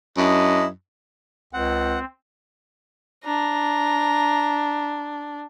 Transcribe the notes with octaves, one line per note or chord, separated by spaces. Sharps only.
F#2 D4 E4 D#5
C#2 C4 F#5
D4 A#5